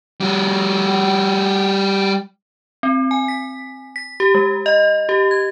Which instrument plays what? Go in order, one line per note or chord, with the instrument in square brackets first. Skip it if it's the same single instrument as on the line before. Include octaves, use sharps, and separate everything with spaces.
[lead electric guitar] G3 F#4
[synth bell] C4
G#5
B6
B6
G4
G#3
D#5
G4
G#6